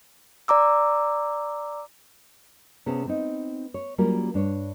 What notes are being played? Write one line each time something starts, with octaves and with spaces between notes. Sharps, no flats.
D5 A#5 D6 E6
C3 B3 C#4 G#4 A5
B3 C4 D#4
C#5
F#3 G3 A#3 C#4 F4 A#4
G2 D4 C#5